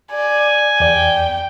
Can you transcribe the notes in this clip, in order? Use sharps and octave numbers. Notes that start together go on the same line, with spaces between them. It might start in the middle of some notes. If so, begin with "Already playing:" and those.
D5 G#5
E2 D5 G5